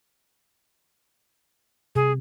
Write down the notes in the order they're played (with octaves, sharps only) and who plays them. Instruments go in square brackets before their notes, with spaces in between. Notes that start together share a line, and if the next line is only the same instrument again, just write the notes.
[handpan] C3 [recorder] G#4